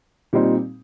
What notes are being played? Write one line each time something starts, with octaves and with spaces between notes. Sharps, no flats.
A#2 G3 C4 D#4